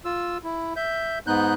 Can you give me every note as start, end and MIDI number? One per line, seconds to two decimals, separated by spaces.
0.05 0.38 65
0.05 0.38 88
0.44 0.73 64
0.76 1.19 76
0.76 1.19 91
1.27 1.54 44
1.27 1.54 59
1.27 1.54 63
1.27 1.54 90
1.27 1.54 91